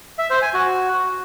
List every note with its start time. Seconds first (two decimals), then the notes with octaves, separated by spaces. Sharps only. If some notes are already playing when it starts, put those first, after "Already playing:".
0.19 E5
0.30 C5
0.42 G#5
0.54 F#4